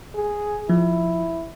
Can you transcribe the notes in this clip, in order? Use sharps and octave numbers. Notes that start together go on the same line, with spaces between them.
G#4
F3 E4